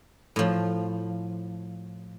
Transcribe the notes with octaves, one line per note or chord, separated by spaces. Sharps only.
A2 F3